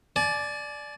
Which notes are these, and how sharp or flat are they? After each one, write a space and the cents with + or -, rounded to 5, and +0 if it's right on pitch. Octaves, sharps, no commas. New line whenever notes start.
D5 +0 G#5 +40